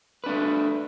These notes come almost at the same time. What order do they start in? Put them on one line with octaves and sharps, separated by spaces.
B4 D4 A3